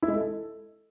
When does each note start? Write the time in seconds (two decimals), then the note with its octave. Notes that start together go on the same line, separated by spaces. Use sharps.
0.03 E4
0.08 G#3
0.14 A4